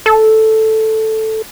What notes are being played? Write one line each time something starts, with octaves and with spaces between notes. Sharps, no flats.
A4